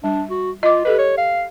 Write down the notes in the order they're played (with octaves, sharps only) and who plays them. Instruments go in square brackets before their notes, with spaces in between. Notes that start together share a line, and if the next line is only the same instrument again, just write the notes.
[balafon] G3 [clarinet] D4
[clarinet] F#4
[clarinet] F4 [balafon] D#5 D6
[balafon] G4 A4 D#5 [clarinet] B4
[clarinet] C#5
F5